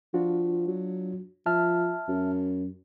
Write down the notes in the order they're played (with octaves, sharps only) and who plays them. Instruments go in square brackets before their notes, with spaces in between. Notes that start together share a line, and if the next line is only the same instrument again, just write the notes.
[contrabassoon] F3 [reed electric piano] D4 F4 F#4
[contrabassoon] F#3
[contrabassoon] F3 [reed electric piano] E5 A5 F6
[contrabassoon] F#2